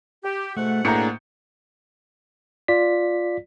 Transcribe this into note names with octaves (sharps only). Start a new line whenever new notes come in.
G4
G#2 B2 A3 F#5
A2 A#3 D4 G#4 A#5 G6 C#7
F4 D5 B6